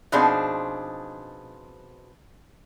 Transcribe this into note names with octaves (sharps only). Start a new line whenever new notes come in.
B2 F3 C4 D4 D#4 G#4